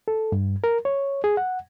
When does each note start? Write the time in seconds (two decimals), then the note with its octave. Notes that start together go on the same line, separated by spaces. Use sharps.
0.08 A4
0.32 G2
0.64 A#4
0.85 C#5
1.24 G#4
1.37 F#5